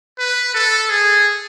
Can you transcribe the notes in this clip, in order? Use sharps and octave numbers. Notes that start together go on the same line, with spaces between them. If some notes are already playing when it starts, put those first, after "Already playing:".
B4
A4
G#4